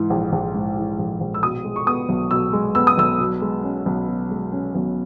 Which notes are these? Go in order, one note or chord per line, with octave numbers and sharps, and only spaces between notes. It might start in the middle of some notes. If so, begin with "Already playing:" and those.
Already playing: G#2 E3
A#1
A#1
G#2
E3
A#1
A#1
E6
B2 D#6
G#3
C#6
B3 D#6
B1
B2 E6
G#3
B3 E6
D#6
B1 E6
B2
G#3
C#4
B1
B2
G#3
C#4
B1